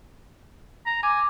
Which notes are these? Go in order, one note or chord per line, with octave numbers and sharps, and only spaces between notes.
A#5
G#5 D6